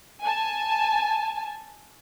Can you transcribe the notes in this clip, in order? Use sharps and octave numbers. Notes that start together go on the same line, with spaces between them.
G#5 A5